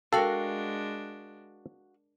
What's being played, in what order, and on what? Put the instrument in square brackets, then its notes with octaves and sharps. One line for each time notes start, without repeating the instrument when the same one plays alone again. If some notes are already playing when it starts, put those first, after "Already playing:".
[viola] G#3 D4 [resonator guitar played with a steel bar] F#4 F5 [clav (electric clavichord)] A4 [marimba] A#4 G5